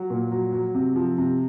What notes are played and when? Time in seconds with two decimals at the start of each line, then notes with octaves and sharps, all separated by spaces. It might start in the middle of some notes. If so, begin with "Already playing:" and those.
Already playing: F#3
0.10 A#2
0.32 F#3
0.53 F#3
0.75 C3
0.96 F3
1.18 C3